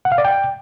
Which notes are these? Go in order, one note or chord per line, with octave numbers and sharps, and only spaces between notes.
F#5
F5
D5
G5